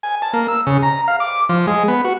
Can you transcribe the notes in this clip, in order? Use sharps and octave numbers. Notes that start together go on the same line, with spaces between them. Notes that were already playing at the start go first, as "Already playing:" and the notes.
G#5
A5
A#3
E6
C#3
A#5
F5
D6
F3
G#3
B3
F#4